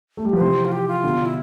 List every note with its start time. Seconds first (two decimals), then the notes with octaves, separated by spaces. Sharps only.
0.17 A3
0.25 G3
0.33 F3
0.36 B4
0.40 C3 E3 C5
0.65 F4
0.72 G4
0.88 F4
1.04 B2 D3
1.26 E4